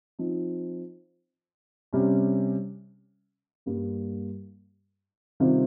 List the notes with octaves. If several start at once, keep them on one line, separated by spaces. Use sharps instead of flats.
F3 C4 D#4
C3 G3 C#4
G2 G3 A#3
C3 D#3 G3 C4 F4